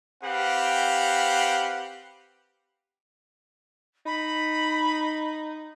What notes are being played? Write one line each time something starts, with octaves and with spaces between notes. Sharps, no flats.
C4 G4 B4 F5 F#5
D#4 B5